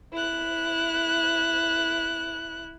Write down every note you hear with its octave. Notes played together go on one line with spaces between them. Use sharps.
E4 F#6